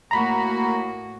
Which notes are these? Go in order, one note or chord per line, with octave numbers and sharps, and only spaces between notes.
A2 A#3 F#4 A#5 B5